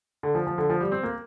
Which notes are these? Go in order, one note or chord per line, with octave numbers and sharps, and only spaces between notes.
D3
F3
F3
D3
F3
G3
C4
A#3